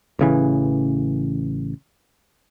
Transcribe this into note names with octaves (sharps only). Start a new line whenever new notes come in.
A1 C#3 E3